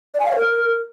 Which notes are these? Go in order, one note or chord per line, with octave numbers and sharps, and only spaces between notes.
D5
G#5
F5
C#5
A#4